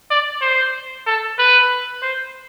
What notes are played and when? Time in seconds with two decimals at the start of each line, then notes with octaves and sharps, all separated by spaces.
0.11 D5
0.42 C5
1.07 A4
1.38 B4
2.03 C5